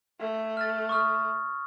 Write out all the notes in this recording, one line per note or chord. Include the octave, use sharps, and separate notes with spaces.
A3
F6 A6
C#6 D#6 F6